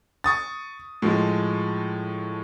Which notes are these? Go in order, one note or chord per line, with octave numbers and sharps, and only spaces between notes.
C#6 D#6 A6
A2 F3 G#3